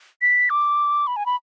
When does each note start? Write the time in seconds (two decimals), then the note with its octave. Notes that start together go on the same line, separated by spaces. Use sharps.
0.22 B6
0.50 D6
1.07 B5
1.16 G#5
1.26 B5